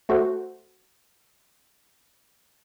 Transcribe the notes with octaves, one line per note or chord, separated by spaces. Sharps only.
A3 F#4 A4 C5 F#5